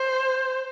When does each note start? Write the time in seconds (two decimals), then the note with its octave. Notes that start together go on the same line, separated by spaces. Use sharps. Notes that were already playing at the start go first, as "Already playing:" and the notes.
Already playing: C5